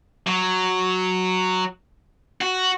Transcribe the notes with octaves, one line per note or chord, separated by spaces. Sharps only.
F#3
F#4